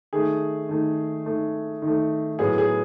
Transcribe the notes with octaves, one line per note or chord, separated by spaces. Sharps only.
D#3 A3 G#4
D#3 A3
D#3 A3
D#3
A3
A2 F#3 B3 G#4
G#4